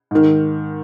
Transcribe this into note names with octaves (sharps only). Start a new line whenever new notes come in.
G#2 D#3